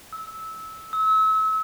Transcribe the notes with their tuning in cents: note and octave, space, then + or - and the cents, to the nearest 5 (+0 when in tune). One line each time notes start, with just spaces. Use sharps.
E6 -20
E6 -35